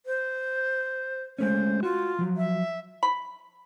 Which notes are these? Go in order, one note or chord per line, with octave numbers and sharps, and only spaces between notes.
C5
G#3 A3 C#4 C5
F4 F#4
F3 F#3
E5
B5